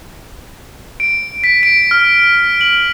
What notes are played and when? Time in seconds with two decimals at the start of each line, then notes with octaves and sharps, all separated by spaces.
1.00 D7
1.44 B6
1.63 D7
1.91 F6
2.61 F#7